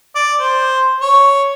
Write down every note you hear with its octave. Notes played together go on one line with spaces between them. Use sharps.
D5
C5
C#5